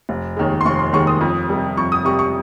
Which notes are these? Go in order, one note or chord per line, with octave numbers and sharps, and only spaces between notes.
F1
D#2 D#3 G#3
C6
F1 C#6
C6
D#2 D#3 G#3 C#6
D#6
F2
C3 G3
F2 C#6
D#6
C3 G3 C#6
C#6